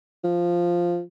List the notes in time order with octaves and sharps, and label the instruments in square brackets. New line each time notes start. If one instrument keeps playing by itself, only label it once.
[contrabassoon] F3